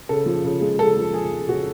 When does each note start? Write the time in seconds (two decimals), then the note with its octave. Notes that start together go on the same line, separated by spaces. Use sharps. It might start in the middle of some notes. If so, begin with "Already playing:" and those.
0.09 C#3 A4
0.26 F3
0.44 C#3
0.61 G#3
0.79 C#3 A4
0.97 F3
1.14 C#3 G#4
1.31 G#3
1.48 C#3 F#4